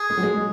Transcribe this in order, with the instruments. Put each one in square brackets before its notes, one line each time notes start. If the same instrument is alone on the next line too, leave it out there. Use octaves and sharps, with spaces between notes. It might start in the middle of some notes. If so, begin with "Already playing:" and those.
Already playing: [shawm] G#4
[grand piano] G#3
F#3
G#3